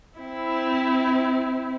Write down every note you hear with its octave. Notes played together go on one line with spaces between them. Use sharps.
C4 E4